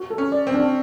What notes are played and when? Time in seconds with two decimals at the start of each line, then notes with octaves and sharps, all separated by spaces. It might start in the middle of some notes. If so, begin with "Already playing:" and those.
Already playing: F#4
0.10 A4
0.18 C#4
0.32 D5
0.47 C4
0.54 D4